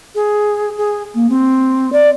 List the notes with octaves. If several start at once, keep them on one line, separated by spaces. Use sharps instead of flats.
G#4
G#4
A#3
C4
D5